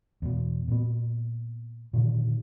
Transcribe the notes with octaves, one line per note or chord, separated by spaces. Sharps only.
E2 B2
A#2 B3
A#2 D3 D#3